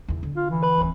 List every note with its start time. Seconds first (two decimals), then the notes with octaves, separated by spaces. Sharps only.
0.08 E2 D#3
0.23 D3
0.36 F4
0.50 E3
0.63 B4 B5
0.78 D1 D#2